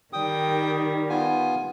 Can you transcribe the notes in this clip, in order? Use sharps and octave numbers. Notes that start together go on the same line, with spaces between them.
D#3 G3 G5 D#6
B3 F4 G#5